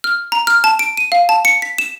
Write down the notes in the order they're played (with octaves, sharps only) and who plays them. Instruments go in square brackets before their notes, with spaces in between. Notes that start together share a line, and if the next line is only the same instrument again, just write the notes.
[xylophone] F6
A#5
F6
A5
D7
D#7
F5
A5
C#7
B6
E7